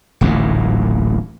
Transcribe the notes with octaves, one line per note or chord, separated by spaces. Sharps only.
D1 A1 D#2 A#2